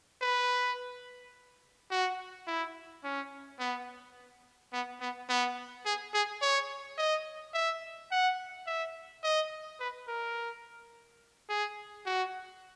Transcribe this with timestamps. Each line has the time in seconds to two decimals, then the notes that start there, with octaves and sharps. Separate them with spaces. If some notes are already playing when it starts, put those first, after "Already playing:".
0.22 B4
1.91 F#4
2.47 E4
3.04 C#4
3.59 B3
4.73 B3
5.01 B3
5.29 B3
5.86 G#4
6.14 G#4
6.42 C#5
6.98 D#5
7.54 E5
8.11 F#5
8.67 E5
9.23 D#5
9.80 B4
10.08 A#4
11.49 G#4
12.06 F#4